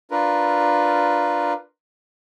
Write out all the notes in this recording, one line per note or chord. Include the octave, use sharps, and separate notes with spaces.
D4 F4 A#4 B4